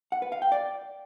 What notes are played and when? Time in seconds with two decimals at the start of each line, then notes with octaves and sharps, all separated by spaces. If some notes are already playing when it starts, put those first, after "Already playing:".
0.12 F#5
0.22 B4
0.32 F5
0.42 G5
0.52 D5